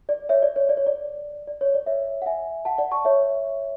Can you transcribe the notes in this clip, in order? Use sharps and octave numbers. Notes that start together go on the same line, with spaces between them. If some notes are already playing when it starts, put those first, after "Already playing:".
D5
C#5 E5
D5
C#5
D5
C#5
D5
D5
C#5
D5
C#5 E5
F#5
E5 G#5
F#5 A5
D5 F#5
A5 C#6
C#5 E5